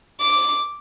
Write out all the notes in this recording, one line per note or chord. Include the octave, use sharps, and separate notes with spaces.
D6